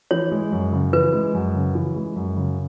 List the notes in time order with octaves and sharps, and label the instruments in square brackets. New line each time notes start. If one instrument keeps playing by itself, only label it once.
[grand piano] E3 [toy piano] C#5
[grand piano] G#3
F#2
C#3
[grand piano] E3 [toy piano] B4
[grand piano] G#3
F#2
C#3
E3
G#3
F#2
C#3